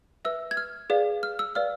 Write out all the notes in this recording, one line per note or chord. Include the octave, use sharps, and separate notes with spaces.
B4 E5 E6
G#6
F6
G#4 B4 D5 F5
F6
E6
B4 D5 F5 F6